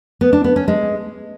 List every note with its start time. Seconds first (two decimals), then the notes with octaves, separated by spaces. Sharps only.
0.21 B3
0.33 D4
0.44 B3
0.56 C#4
0.68 G#3